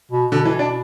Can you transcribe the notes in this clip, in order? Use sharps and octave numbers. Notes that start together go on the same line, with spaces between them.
B2
B2 D3
E3
D4